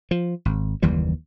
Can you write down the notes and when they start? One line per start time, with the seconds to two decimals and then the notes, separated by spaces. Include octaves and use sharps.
0.11 F3
0.45 G#1
0.82 F#1 D#2 E3 G3